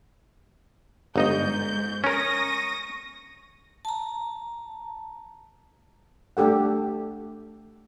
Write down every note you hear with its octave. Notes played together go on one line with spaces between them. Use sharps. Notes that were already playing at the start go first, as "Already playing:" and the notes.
G1 G#2 D#4 D#5 G6
C#4 A#4 C#6 D#6 A#6
A5 A#5
A3 D4 G4 A4 F#5